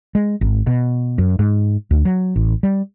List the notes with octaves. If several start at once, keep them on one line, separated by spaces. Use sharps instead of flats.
G#3
G#1
B2
F#2
G#2
D2
F#3
A1
G3